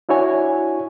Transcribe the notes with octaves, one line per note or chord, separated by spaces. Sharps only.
D4 E4 F#4 C#5 G#5